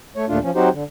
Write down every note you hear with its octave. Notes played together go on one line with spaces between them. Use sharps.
A3 C#5
D#2 A#2 A3 D4 F4
F3 C#4
F#3 C4 D#4 F#4 G4 C5
D3